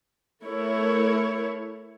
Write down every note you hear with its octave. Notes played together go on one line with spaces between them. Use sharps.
A3 E4 A#4 C#5